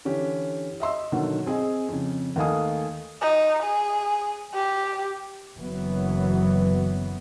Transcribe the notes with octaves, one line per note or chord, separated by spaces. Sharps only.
D3 E3 C#4 G4
D#5 E5 C6 E6
B2 D3 D#3 F#3
C4 G#4 D#5 G#5
F2 C#3
D#2 A3 D#5 F5 G#5 D#6
D#4
G#4
G4
F#1 E3 F#3 B3